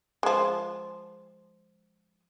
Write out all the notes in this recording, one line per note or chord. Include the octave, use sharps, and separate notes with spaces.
F3 G#3